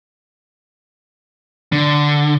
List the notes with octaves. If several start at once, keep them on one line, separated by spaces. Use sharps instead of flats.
D3